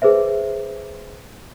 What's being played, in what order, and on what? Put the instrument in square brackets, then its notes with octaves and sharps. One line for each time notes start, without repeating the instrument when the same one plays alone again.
[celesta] G#4 B4 C5 E5